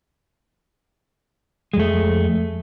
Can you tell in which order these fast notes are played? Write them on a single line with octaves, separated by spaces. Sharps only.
G#3 F2 A3